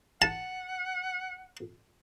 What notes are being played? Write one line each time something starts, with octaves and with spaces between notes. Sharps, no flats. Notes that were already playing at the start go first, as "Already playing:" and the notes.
F#5 A5